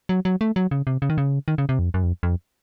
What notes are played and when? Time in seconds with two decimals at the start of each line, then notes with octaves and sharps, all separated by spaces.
0.09 F#3
0.25 F#3
0.41 A3
0.56 F#3
0.71 C#3
0.87 C3
1.02 C#3
1.10 D#3
1.18 C#3
1.48 D#3
1.58 C#3
1.69 C3
1.79 F2
1.94 F#2
2.03 F2
2.23 F2